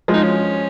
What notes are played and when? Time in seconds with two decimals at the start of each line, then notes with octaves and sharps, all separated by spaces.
0.08 F3 G#3
0.14 D#4
0.23 C#4